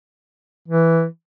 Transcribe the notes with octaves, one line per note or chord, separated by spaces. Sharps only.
E3